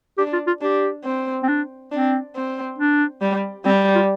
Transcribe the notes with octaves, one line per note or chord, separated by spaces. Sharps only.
D4 G4
F4
F4
D4 G4
C4
C4
D4
C4 D4
C4
D4
G3
G3 C4
F4